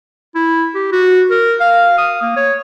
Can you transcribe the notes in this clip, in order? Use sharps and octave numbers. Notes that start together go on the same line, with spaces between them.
E4
G4
F#4
A#4
F5
D#6
A#3
C#5